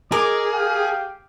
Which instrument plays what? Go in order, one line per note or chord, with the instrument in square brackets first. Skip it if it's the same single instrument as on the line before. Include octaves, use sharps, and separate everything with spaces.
[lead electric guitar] G#4 [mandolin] A#4 [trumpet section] D#5 D6
[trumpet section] G4 F5 G5